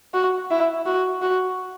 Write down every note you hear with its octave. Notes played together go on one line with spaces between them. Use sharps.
F#4
E4
F#4
F#4